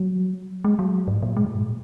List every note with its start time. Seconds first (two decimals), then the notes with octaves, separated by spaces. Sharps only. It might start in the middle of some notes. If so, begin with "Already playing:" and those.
Already playing: F#3
0.64 G#3
0.79 F#3
1.08 G#2
1.22 A#2
1.37 G#3
1.45 A#2
1.55 G#2